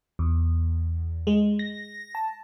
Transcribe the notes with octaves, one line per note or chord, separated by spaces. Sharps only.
E2
G#3
A#6
A5